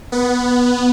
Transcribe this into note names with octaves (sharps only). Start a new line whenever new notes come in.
B3